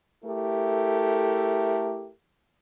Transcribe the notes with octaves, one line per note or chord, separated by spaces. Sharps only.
A3 E4 G4 A4 A#4